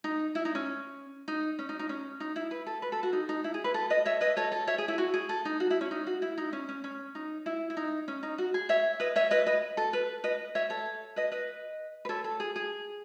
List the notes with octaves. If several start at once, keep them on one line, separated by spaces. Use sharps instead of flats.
D#4
E4
D#4
C#4
D#4
C#4
D#4
D#4
C#4
D#4
E4
B4
A4
B4
A4
F#4
D#4
D#4
E4
G#4
B4
A4
B4 D#5
C#5 E5
B4 D#5
A4 C#5
A4
C#5 E5
G#4
E4
F#4
G#4
A4
D#4
F#4
E4
C#4
D#4
F#4
E4
D#4
C#4
C#4
C#4
D#4
E4
E4
D#4
C#4
D#4
F#4
G#4
C#5 E5
B4 D#5
C#5 E5
B4 D#5
B4 D#5
A4
B4
B4 D#5
C#5 E5
A4 C#5
B4 D#5
B4 D#5
B4
A4 C#5
A4
G#4
G#4